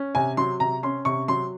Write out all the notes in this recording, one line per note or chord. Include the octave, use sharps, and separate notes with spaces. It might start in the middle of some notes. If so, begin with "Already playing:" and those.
Already playing: C#4
C3 G#5
F#3 C6
C3 A#5
C#4 C6
C3 C#6
F#3 C6